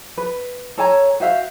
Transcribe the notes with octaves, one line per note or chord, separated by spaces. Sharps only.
B4
A4 C#5 G#5 A#5
F#4 C5 E5 F5